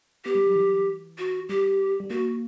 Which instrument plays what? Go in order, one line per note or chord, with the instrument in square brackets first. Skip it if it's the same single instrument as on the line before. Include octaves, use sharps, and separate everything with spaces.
[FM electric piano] B3 [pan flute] G4
[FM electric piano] G3
F#3
E3
[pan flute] F#4
[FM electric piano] G3 [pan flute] G4
[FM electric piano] G3
[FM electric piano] A#3 [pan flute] F#4